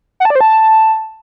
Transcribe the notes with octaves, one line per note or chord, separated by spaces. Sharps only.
F#5
A5
D5
C5
A5